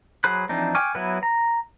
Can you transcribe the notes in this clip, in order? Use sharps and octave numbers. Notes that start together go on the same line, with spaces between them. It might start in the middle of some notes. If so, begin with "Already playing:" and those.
F#3 G#4 C5 B5 F#6
E3 F3 C4 D4 D#4
G5 G#5 C#6 D6 F6
F#3 B3 E4 B4
A#5